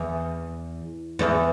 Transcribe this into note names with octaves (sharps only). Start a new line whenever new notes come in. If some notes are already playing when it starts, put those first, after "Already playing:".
Already playing: E2
E2